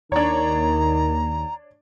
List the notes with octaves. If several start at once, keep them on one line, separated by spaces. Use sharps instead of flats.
D#2 D#3 D4 C#5 A#5